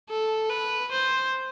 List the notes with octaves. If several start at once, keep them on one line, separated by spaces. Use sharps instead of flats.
A4
B4
C5